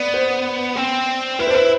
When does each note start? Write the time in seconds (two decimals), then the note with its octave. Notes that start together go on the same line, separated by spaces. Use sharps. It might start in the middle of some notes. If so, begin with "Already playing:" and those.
Already playing: B3 D5
0.14 C5
0.76 C4
1.39 E4 B4
1.47 C5
1.51 D4
1.55 E4 B4